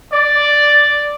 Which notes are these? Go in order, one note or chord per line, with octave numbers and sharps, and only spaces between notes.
D5